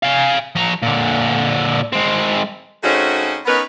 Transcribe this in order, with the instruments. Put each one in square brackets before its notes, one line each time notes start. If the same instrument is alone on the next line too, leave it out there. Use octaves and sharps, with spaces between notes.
[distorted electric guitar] F5 G#5
F3 A#5
A#2 D3
G#3 C4
[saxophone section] C#3 A3 C4 C#4 D#4 F#4
B3 C#4 D#4 A#4 B4